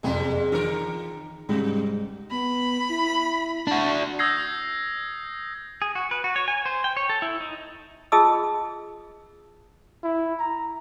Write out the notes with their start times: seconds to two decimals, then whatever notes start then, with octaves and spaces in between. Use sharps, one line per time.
0.03 F#1 F2 G#2 C3 G3 G#3
0.52 D#3 E3 A#4
1.49 G#2 C3 G3 G#3
2.31 B3 B5
2.89 E4
3.67 D4 F#4
4.19 D#6 E6 G6 G#6 A#6 C7
5.82 G#4
5.95 F#4
6.11 B4
6.24 F#4
6.36 C#5
6.48 G#5
6.66 C5
6.84 G5
6.97 C#5
7.10 A4
7.22 E4
7.40 D#4
8.12 F4 G#4 D#5 A5 D#6 E6
10.04 E4
10.39 A#5